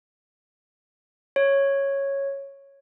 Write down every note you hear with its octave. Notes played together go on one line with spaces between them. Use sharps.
C#5